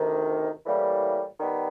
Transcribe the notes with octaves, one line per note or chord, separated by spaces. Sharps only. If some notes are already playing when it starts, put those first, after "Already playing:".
Already playing: D2 C3 D#3
A2 E3 G3 A#3
D#3 G3 B3